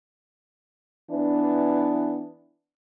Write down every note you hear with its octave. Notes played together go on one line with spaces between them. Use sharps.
E3 B3 D4